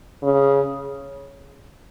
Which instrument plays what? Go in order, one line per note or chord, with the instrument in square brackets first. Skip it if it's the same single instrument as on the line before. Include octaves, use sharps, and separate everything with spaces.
[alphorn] C#3